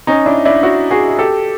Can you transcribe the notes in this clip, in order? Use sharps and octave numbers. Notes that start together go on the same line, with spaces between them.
C#4 D#4
D4 E4
D4 E4
E4 F#4
F#4 G#4
G#4
G4 A4